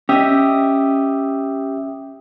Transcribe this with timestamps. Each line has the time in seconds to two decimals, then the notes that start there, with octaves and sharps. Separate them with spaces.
0.09 C#4 G4 D#5 E5 D#6